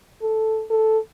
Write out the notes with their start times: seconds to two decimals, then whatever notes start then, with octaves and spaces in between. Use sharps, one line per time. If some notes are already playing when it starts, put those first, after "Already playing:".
0.22 A4
0.70 A4